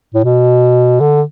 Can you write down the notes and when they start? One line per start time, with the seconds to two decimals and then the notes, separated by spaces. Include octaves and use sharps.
0.14 A2
0.25 B2
1.00 D3